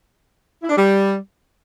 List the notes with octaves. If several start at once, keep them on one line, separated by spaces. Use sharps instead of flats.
E4
D4
G3